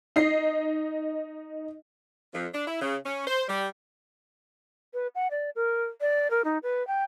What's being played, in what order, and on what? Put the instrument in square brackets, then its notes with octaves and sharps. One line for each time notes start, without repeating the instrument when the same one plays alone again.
[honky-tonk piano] D#4 D#5 C7
[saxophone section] F2
D4
E4
C#3
C#4
C5
G3
[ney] B4
F#5
D5
A#4
D5
A#4
D#4
B4
G5